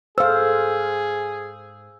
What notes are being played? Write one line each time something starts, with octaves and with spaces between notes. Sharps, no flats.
G#2 G#4 A4 C5 F5 E6